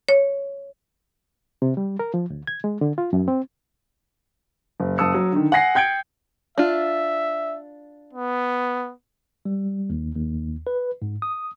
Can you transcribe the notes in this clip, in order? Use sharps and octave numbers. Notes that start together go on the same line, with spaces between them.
C#5
C3
G3
A#4
F3
D2
G#6
G#3
D3
F4
F#2
C4
F#1
F#1 A5 D#6 E6 C#7
F#3
D3 D#3
F#5 G#5 A#6 C7
G5 G6 G#6 C#7 D7
D4 F4 E5
B3
G3
D#2
D#2
B4
G#2
D#6